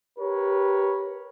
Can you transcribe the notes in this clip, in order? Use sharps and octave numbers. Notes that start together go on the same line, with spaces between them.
G4 A#4 B4 C#5